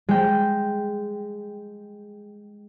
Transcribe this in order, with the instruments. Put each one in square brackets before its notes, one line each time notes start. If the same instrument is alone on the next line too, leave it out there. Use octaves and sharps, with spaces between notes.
[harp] G#3 G5